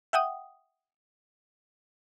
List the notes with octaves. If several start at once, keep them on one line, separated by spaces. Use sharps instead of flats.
E5 F#5 G5 D#6